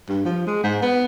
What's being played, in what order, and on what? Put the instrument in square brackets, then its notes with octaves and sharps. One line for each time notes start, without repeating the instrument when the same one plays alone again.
[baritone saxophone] G2
F3
G#3
G#2
B3